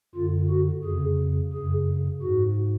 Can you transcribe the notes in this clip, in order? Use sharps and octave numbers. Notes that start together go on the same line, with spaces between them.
F#2 D3 F4
F#4
F2 C#3 G#4
F#2 C#3 G#4
G#2 F#4